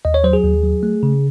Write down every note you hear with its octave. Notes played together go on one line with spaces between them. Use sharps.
D#2 D#5
C#5
F#3 C5
G#4
D#2
F#3
A3
C#3